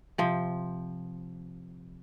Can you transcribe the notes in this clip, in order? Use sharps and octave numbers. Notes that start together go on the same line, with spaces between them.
C3 F3